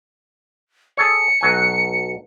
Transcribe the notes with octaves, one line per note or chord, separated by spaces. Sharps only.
G#4 A4 C#5 C#7
B1 F#3 G#5